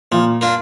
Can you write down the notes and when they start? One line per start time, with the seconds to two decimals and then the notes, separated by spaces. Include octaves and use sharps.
0.11 A#2 F3
0.41 A#3 D4 F4